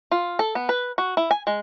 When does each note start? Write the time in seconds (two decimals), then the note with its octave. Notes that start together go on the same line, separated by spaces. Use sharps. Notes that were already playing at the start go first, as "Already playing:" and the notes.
0.11 F4
0.39 A4
0.55 B3
0.69 B4
0.98 F#4
1.17 E4
1.31 G#5
1.47 G#3